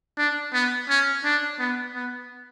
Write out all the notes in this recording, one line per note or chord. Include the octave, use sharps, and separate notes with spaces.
D4
B3
C#4
D4
B3
B3